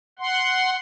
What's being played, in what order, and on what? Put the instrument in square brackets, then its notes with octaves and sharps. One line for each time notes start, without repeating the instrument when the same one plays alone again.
[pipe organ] F#5 C6